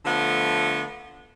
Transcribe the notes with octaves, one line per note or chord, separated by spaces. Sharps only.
D3 F3 A3 B3